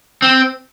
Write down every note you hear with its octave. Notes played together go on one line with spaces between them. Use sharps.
C4